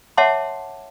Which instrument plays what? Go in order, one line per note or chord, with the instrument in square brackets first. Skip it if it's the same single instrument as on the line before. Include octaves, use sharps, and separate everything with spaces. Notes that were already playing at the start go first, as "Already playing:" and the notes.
[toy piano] C#5 E5 F#5 A5 C6 D6